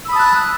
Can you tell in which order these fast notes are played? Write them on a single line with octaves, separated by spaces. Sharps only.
E6 B5 D#6 A5 F#6